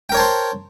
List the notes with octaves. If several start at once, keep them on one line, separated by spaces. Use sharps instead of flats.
A#4 C5 C#5 G5 A5